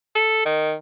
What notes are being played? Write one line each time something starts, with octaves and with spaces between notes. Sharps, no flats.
A4
D#3